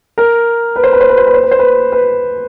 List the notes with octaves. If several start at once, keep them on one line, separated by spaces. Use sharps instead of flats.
A#4
B4
C5
B4
C5
B4
C5
B4
C5
B4
C5
B4
B4